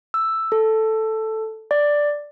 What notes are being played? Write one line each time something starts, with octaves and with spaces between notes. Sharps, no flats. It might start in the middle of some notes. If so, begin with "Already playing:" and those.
E6
A4
D5